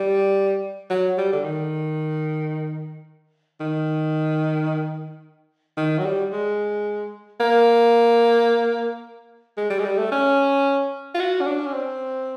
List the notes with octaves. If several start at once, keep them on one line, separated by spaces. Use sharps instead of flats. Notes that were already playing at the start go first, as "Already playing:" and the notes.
Already playing: G3
F#3
G3
D3
D#3
D#3
D#3
F#3
G3
G#3
A#3
G#3
G3
G#3
G3
A3
C#4
F4
F#4
C#4
D4
C#4
C4